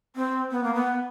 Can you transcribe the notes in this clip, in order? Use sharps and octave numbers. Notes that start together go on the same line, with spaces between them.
C4
B3
A#3
B3